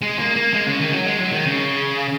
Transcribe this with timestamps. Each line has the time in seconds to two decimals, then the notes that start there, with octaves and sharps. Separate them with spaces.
0.02 G#3
0.19 A#3
0.36 A#3
0.54 G#3
0.67 C#3
0.79 D#3
0.93 F#3
1.06 G#3
1.19 F#3
1.32 D#3
1.46 C#3